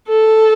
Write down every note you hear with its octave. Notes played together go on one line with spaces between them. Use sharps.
A4